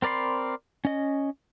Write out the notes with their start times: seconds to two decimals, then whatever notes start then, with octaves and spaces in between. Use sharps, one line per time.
0.02 C4 A#4 D5 B5 C6
0.85 C#4 D#5